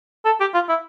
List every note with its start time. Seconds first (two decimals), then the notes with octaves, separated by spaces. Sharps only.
0.25 A4
0.40 G4
0.54 F4
0.69 E4